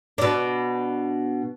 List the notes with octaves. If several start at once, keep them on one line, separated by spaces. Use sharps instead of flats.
B2 D4